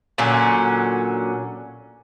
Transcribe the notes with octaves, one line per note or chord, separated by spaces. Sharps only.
A#2 D3 F#3 C#4